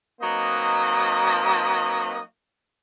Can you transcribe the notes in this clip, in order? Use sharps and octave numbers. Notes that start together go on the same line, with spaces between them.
F#3 A#3 C4 D#4 B4 D#5